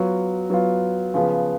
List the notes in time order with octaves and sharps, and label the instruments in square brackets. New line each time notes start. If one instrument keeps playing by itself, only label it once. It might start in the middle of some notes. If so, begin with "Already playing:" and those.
Already playing: [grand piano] F#3 B3 F4
F#3 B3 F4
C#3 F3 B3